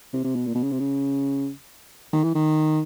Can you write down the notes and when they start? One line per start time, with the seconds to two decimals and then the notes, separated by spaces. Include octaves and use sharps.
0.13 C3
0.24 C3
0.35 B2
0.47 A#2
0.55 B2
0.63 C#3
0.72 C3
0.80 C#3
2.13 D#3
2.24 E3
2.35 D#3